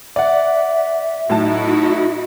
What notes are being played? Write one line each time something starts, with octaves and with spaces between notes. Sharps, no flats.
D5 E5 F#5
A2 F#3 D#4 E4 F#4 A5